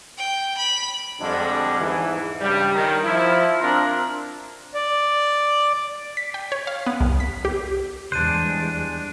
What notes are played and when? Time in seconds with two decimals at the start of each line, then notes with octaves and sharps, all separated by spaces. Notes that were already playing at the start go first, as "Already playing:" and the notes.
0.18 G5
0.58 B5
1.20 F2 D3 G3 G#3 D4
1.80 E2 G#2 E3
2.40 C#2 G2 G3
2.73 D#3
3.04 F3 E4
3.60 C4 D4 F4 A#4
4.74 D5
6.17 B6
6.34 G5
6.52 C#5
6.67 F5
6.87 B3
7.01 C2
7.20 B6
7.45 G4
8.12 E2 G3 G#3 D4 C5 F#6 D#7